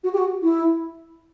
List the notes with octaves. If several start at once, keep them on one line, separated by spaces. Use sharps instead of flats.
F#4
G4
F#4
E4